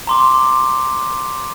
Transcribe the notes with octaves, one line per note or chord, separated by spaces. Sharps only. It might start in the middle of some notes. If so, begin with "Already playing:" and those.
A#5 C6 D6